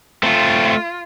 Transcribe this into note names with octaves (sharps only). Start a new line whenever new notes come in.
A3 C4 F4